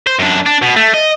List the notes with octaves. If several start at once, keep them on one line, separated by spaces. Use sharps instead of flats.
C5
F#2 D4
D4
B2
A3
D#5